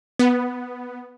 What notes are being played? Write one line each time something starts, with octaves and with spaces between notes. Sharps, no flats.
B3